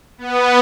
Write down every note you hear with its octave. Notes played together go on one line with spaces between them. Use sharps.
B3